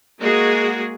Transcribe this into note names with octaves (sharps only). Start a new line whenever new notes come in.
G#3 A#3 F#4 G#4